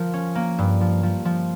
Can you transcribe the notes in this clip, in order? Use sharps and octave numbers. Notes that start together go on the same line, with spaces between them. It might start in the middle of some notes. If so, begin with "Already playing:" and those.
Already playing: F3 A#4
C#4
A#3
G2
F3
F3
F3